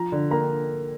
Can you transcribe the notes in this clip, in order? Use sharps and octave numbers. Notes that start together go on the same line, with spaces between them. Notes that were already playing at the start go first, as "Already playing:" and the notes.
Already playing: F3 A#5
D3
A#3 A#5